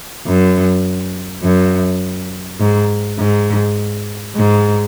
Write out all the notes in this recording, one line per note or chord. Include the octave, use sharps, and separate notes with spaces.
F#2
F#2
G#2
G#2
G#2